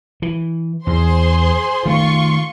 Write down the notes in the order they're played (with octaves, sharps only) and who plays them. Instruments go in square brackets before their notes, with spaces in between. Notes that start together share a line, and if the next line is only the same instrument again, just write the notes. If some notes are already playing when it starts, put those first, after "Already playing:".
[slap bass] E3
[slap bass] E2 [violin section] G#4 C5 C6
[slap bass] D#3 A3 [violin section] F4 C6 C#6